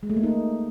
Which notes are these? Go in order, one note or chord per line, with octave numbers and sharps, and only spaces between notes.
G#3
A3
A#3
D#4